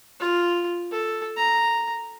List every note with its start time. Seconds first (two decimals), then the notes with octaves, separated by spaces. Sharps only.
0.20 F4
0.92 A4
1.37 A#5